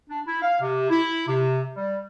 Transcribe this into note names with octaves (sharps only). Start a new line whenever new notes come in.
D4
E4
F5
C3
E4
C3
G3